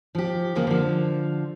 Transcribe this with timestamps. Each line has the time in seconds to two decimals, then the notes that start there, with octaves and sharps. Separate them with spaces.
0.15 F3 G4
0.55 C#3 F3 A#3
0.67 D3 F3